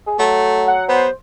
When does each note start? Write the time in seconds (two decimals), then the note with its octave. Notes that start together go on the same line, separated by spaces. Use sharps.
0.07 G#4
0.19 F#3 A3
0.67 F#5
0.88 B3 C5